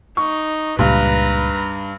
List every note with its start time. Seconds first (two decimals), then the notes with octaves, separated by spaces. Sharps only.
0.17 D#4 C#6
0.79 C#2 G2 A#2 B4 A#5